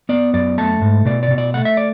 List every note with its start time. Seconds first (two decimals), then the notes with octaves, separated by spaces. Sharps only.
0.09 B3 D5
0.34 F#2 D5
0.58 A3 A5
0.82 G#2
1.05 B2 D5
1.23 D5
1.31 B2
1.38 D5
1.54 A3 F#5
1.65 E5
1.77 D5